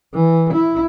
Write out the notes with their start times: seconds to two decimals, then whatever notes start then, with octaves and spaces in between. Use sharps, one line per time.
0.14 E3
0.53 E4